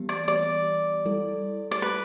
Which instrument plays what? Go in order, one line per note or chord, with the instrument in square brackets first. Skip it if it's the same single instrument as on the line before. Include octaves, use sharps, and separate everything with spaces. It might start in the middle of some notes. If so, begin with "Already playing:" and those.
Already playing: [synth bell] E3 G3 B3 G4
[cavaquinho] D5
D5
[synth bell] G3 E4 A4
[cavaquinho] D5
B4